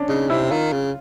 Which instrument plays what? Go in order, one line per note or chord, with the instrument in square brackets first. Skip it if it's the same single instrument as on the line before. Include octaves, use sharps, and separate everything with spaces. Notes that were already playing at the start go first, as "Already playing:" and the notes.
Already playing: [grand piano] C#4 D4
[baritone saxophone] C#3 [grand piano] D#4
[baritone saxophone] C3 [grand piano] E4
[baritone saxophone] D#3 [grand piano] F4
[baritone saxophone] C#3